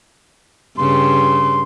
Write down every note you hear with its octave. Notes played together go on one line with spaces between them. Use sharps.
G2 C#3 C6